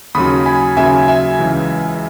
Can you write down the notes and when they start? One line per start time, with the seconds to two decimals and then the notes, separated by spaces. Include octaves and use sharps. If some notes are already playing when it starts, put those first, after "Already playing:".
0.15 D#2 C#3 F#3 B5 D#6
0.46 G#5 B5
0.77 D#2 C#3 F#3 E5 G#5
1.08 E5 G#5
1.39 C#2 C#3 E3